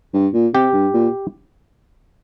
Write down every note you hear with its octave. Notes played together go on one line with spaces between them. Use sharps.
G2
A#2
C3 G4
G2
A#2